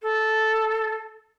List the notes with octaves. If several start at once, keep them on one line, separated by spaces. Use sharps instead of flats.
A4